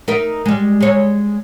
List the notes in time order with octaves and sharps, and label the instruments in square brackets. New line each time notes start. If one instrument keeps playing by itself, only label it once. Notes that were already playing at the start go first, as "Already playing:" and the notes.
[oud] D#4 A#4 E5
G3 G#3
G#3 C#5